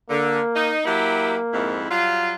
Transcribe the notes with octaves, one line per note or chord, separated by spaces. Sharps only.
D3 A#3
D#4
F#3 A#3 E4 G4
F2 G#2 E4
F#3 G3 F4